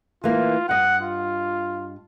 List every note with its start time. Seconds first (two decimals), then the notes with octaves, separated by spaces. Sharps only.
0.24 E3 A#3 F4
0.69 G2 D#5 F#5
1.03 F4